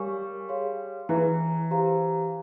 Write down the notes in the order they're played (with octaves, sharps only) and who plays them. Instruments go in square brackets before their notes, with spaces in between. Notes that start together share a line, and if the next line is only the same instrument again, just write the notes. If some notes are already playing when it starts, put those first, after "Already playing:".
Already playing: [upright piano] G3 [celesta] A#4 C#5 F5 G#5 C#6
[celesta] G#4 C#5 F5 C6
[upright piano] E3 [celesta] G#4 E5 A#5
[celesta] G4 C5 F5 A#5